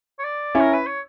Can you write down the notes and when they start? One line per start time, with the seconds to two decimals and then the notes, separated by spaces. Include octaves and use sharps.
0.19 C#5
0.24 D5
0.55 C#4 E4
0.60 A#4
0.73 B4
0.87 C#5